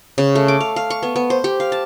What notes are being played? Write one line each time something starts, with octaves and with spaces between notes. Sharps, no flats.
C#3
A3
D6
F5
F5
C#6
B3
B3
C5
G4
F5
A5